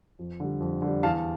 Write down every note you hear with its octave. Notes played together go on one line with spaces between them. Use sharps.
F2
D3 G3
F2
D3 G3
E2 F5 A5